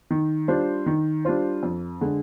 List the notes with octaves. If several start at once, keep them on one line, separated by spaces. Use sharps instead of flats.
D#3
G3 D4 F4 C5
D#3
G3 D4 F4 C5
F2
D3 G#3